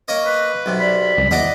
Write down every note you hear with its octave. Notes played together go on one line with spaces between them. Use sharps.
A#3 C#5 D#5
B4
B1 C3
D5 B5
C#2
E2 E3 D5 D#5 F#5